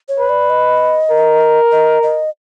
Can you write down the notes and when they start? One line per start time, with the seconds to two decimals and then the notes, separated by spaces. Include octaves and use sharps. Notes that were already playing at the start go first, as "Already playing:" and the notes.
0.08 C#5
0.19 B4
0.29 D5
0.50 D#5
1.11 A#4
1.72 D#5
2.03 D#5